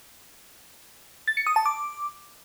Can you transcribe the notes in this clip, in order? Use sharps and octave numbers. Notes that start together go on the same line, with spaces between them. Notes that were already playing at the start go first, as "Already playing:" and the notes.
A6
C#7
D#6
A5
D6